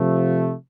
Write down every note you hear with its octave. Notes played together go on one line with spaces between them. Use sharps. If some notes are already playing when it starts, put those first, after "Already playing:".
Already playing: C3 F3 A3